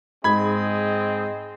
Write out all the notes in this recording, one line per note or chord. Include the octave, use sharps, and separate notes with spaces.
G#2 C4 G#4 D#5 B5 G#6